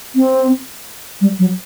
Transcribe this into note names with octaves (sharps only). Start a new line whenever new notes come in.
C4
G3
F#3